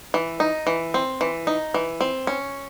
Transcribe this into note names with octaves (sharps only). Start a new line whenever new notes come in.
E3
D#4
E3
C4
E3
D#4
E3
C4
C#4